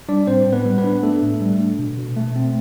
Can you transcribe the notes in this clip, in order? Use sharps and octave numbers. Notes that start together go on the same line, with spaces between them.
G3 D4 D5
A2 C4 C5
A2
B3 B4
G3
B3 B4
D4
A3 D4 A4
A2
G3
D4
B2
B2
A3
C4